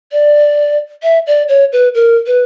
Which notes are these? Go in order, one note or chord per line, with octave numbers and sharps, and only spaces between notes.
D5
E5
D5
C#5
B4
A#4
B4